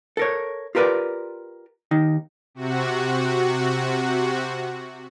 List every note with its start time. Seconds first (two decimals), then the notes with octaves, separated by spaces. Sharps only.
0.17 A4 A#4 C#5
0.75 F4 G4 A#4 B4 D5
1.91 D#2 D#3 D#4
2.55 C3 F#4